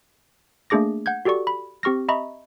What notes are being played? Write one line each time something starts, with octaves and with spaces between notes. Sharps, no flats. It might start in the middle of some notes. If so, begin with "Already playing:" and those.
A3 A#3 D4 G#4 D6 A#6
F#5 G6 G#6
F#4 G4 A4 D5 C#6
B5
C4 G4 C#6 F6 A#6
D#5 E5 A#5 B5 C#6